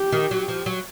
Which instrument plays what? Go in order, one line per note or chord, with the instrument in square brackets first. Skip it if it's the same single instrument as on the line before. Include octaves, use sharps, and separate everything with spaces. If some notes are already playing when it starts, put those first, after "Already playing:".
Already playing: [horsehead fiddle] G4
[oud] D#3
F#3
F3
F#3